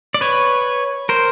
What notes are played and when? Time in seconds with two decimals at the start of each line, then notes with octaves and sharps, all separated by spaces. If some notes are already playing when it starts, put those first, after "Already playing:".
0.14 D5
0.21 B4 C#5
1.09 A#4 C5